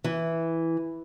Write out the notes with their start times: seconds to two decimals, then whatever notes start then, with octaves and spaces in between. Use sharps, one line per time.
0.04 E3